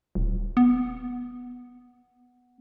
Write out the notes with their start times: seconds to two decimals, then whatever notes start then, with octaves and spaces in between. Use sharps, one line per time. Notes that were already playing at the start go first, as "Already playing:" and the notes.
0.15 D#1
0.57 B3